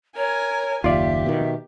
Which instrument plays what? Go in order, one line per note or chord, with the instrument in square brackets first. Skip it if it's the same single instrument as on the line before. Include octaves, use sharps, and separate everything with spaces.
[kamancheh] A#4 G#5 [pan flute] C#5
[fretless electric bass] F#1 D#2 [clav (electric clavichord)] F4 D5 [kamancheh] G4 [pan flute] E5
[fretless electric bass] B2 D#3